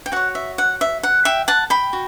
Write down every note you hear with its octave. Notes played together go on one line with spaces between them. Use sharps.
G5
F#4 C#5 F#5
E5
F#5
E5
F#5
E5 G5
F#5 A5
G5 B5
F#4